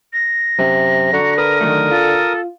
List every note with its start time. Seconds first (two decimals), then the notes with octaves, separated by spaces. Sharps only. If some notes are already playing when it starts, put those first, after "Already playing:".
0.13 A#6
0.59 F#2 C3
1.13 D3 F#4 F#5 A#5
1.38 A#4 B4 D#6
1.61 D#3 F#3 A3
1.91 F4 A4